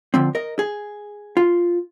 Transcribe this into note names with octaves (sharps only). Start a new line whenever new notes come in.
D3 F3 C4
A#4 D#5
G#4
F4